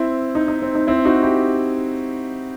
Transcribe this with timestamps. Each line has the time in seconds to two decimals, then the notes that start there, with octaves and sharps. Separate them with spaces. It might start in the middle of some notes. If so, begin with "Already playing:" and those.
Already playing: C4 E4
0.35 D#4
0.48 D#4
0.62 C4
0.75 D#4
0.87 C4 E4
1.05 D#4 F#4
1.23 E4 G4